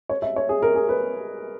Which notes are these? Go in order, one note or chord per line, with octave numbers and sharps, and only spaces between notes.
C#5
E5
C#5
G#4
A#4
G#4
B4